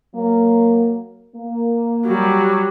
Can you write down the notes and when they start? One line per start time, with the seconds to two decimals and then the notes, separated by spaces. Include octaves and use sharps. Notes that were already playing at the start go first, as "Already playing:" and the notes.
0.14 F#3 A#3
1.36 A#3
2.06 F#3 G3